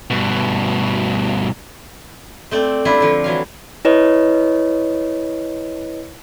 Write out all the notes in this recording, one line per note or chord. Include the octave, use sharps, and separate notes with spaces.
G2 B2
A3 C4 D5
G3 D4 E4 F4
D3 F3
E3 F#3 F5
E4 B4 C#5 D#5